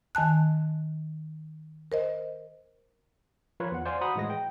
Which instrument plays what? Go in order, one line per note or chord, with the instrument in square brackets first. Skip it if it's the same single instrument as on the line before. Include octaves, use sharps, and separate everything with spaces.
[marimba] D#3 G#5 A5 F#6
A#4 C5 D#5
[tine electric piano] F3 F4 A#4 B4 C#5
E2 F#5
C5 D5 F5 G#5 C6
F#4 F#5 A#5 B5 D#6
A2 E3 G#3 A#6
G5